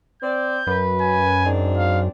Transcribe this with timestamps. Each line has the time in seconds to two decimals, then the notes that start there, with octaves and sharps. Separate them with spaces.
0.22 C4 D5 G6
0.67 F#2 B4
1.02 G#5
1.45 G#2 C4 D4
1.77 F5